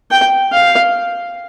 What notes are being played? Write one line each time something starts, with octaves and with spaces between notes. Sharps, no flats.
G5
F5